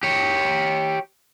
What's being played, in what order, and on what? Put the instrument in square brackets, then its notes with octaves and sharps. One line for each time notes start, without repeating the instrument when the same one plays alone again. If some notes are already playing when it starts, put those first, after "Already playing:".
[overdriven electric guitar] G4 C#5